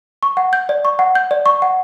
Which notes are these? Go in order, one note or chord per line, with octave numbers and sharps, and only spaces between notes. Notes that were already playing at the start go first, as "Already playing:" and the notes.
C#6
F#5
G6
D5
C#6
F#5
G6
D5
C#6
F#5